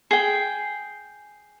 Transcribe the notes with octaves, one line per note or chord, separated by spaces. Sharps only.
G#4 G5